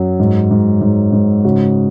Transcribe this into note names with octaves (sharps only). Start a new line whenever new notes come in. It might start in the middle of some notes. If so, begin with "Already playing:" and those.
Already playing: F#2 F#3
G#2
G#2
G#2
G#2
C#3 F#4